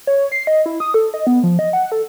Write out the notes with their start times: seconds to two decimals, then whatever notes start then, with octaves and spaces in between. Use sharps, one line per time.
0.07 C#5
0.32 C7
0.47 D#5
0.66 E4
0.80 D#6
0.94 A4
1.14 D#5
1.27 B3
1.43 F3
1.59 D#5
1.73 F#5
1.92 A4